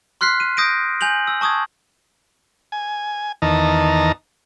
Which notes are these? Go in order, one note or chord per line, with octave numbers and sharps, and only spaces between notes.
C6 F6 F#6 B6 C7
D#7
D#6 G6 A#6 D7 D#7
G#5 G6 F7 F#7
E6
A5 C#6 D#6 E6 G#6
G#5
E2 D#3 D#5 A5 A#5